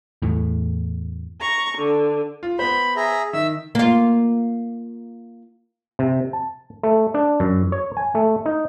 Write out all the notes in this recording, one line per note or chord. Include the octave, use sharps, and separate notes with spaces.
E2 A2
A#5 C#6
D3
F4
B3 C5 B5
G#4 E5 A#5
D#3 E5 E6
A#3 F4
C3
A5
A3
D4
F#2
C#5
G#5
A3
D#4